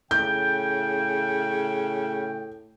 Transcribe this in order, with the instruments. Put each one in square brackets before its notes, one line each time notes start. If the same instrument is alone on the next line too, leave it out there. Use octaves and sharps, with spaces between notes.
[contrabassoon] A2 [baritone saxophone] C#3 [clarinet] G5 [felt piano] G6